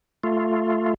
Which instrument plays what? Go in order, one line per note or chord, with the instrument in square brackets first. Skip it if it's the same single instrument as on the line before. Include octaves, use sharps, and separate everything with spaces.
[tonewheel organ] A3 F4